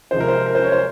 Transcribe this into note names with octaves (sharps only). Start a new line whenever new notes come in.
C3 F3 G#3 D#4 C5
A#4
C5
A#4
C5
C#5
C5